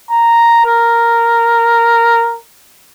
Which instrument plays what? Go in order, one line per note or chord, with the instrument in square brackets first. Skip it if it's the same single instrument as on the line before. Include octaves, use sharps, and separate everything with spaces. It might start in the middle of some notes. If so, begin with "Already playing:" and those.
[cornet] A#5
A#4